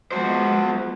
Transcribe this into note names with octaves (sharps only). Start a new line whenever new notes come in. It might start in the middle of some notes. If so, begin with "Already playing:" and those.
F3 G#3 B3 F#4 C5